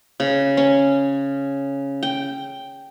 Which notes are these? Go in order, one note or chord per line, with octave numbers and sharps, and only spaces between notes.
C#3
C#4
G5